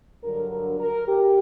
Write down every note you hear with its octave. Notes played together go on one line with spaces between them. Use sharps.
G2 D3 F#3 A#4
A#4
A#4
G4